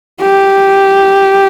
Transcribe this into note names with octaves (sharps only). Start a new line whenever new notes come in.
G4